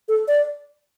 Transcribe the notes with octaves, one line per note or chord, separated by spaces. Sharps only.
A4
D5